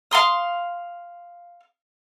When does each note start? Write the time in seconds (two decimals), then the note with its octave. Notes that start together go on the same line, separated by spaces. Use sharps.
0.11 F5 G#5 C6 D#6